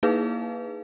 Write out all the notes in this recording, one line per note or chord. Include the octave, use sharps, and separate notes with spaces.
A#3 D#4 E4 G#4 B4 F5